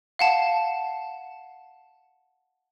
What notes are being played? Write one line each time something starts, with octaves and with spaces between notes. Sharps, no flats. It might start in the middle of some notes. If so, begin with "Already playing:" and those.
F5 F#5 A5